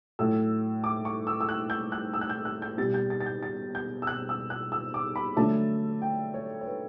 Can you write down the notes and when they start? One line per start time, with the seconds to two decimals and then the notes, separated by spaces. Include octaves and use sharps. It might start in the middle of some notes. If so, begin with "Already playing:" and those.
0.19 A2 F#3 A3 E6
0.84 D6
1.05 C#6
1.27 E6
1.41 E6
1.49 F#6
1.70 G6
1.92 F#6
2.14 E6
2.21 F#6
2.30 G6
2.45 F#6
2.62 G6
2.78 B2 G3 A6
2.94 G6
3.10 A6
3.20 A6
3.26 G6
3.43 A6
3.75 G6
4.02 E6
4.07 F#6
4.29 E6
4.50 F#6
4.72 E6
4.94 D6
5.16 B5
5.36 D3 F#3 A3 A5
6.02 G5
6.34 C#5
6.61 C#5
6.66 B4